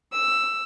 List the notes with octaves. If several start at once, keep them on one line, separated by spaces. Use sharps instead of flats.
E6